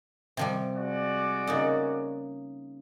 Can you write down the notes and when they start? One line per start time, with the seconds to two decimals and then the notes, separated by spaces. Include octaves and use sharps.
0.37 C3 F3 G3
0.77 G#3 F#4 D5
1.47 C#3 A#3 D#4